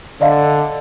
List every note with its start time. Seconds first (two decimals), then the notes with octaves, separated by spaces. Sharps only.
0.21 D3 D5 D#5 F5